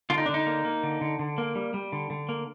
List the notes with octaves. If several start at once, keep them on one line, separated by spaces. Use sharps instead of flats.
D3 F4
D#4
D3 D4
D#4
A#3
A#3
D3
D3
D3
A#3
G3
G3
D3
D3
A#3